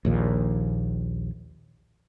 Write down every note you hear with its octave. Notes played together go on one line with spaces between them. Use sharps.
A#1 D#2 A#2